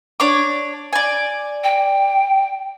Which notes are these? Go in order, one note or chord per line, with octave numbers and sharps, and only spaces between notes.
D4 C#5 D6
D5 G#5
G5